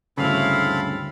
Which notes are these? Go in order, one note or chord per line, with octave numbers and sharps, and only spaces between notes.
D2 G2 C#3 C4 E4 A4 F5 B5